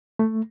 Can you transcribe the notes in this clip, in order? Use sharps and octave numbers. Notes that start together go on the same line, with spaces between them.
A3